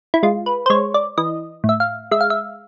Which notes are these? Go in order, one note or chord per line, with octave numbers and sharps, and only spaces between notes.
E4
G#3 F4
B4
C5
G#3 C#5
D5
E3 D#5
A2
E5
F5
G#3 E5
F5
E5